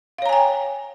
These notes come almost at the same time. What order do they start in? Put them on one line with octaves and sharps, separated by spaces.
F5 C#5 A#5 G#5 G5